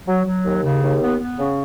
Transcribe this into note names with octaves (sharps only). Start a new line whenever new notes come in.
F#3
F#3
D#2
C#3
D#2
B3
B3
C#3